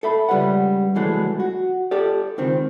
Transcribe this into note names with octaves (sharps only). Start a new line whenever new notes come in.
A4 E5 B5
C#2 G3 B4 F#5
C2 E3 F#3 G#3 A3 B3
F#4
G4 A4 D5
C#2 D#3 C4